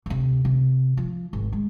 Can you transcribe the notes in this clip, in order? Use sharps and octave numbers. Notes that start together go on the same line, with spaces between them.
D2 C3
C3
F3
G#1
G#3